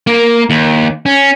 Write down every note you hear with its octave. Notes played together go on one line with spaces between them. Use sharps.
A#3
D#2
C#4